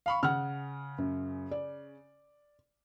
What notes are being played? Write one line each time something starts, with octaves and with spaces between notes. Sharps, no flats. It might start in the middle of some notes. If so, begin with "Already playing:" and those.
F5 B5 C#6
C#3 F#5 F6
F#2
D5